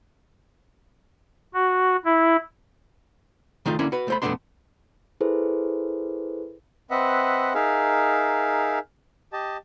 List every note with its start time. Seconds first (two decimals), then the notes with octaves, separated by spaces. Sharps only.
1.54 F#4
2.05 E4
3.66 D#3 A3 D#4 F4
3.79 D3 A#3 C#4 E4
3.92 F#4 B4
4.08 A3 C5 B5
4.22 F2 B2 A3 B3 D4 C6
5.21 E4 G#4 A4 B4 C5
6.91 C4 B4 D#5 E5 F#5
7.54 D#4 G#4 A#4 E5 F5
9.33 G4 D#5 A5